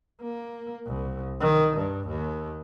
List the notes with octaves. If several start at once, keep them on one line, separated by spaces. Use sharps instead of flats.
A#3
C2
D#3
G2
D#2